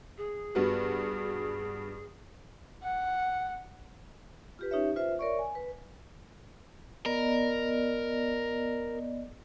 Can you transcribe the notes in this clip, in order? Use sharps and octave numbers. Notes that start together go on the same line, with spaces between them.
G#4
G2 B3 F#4
F#5
F4 G4 B4
C#4 D#4 G4 C#5 E5
F4 B4 C5 E5
A#4 C#5 D5 E5 C#6
G#5
B4
B3 A#4 D5 D#5